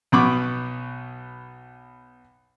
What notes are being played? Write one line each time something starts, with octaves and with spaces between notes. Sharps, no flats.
B1 B2 B3 B5 C#6 D6